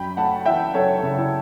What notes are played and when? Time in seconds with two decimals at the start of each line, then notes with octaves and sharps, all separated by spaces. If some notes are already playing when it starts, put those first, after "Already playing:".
Already playing: F#2 G5 B5
0.17 A3 F#5 A5
0.46 E3 E5 G5
0.74 F#2 A4 C#5
1.03 C#3
1.18 E4